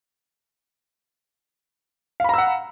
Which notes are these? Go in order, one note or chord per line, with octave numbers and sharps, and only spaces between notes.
F5 F#5 A#5 B5 E6